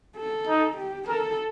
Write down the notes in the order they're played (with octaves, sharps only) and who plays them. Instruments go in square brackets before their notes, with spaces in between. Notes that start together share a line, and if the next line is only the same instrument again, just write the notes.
[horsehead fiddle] A4
[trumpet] D#4
[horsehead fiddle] G4
[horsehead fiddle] A4 [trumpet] A#4